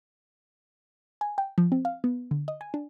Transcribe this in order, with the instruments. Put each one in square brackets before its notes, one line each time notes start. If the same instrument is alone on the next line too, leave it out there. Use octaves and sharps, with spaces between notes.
[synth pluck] G#5
G5
F3
C4
F5
B3
D3
D#5
G#5
D4